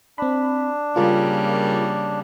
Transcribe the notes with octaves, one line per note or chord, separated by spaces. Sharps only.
C4 D4 B5
C#3 G3 A#3 F4 G#4 A#4